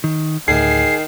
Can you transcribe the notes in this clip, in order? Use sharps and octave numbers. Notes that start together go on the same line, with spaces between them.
D#3
D2 A2 D#3 G#4 C7